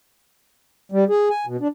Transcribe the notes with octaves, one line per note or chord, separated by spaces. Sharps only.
G3
G#4
G#5
B2
D4